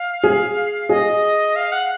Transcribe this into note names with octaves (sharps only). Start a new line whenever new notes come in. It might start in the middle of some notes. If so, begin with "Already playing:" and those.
Already playing: F5
G#4
G#4 D#5
F5
F#5